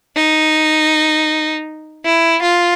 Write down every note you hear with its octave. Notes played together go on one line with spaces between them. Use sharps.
D#4
E4
F4